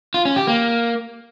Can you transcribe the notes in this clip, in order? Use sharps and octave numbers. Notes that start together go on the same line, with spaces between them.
F4
C#4
G4
A#3